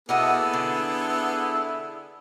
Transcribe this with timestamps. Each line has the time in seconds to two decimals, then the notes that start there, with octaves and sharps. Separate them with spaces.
0.09 A#3 B3 E4 F#4 G#4 A4 D#5
0.53 D3